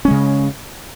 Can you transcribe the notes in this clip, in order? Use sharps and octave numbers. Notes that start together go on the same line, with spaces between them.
C#3 G#3 C#4